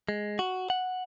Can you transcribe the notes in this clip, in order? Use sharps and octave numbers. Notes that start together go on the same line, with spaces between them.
G#3
F#4
F#5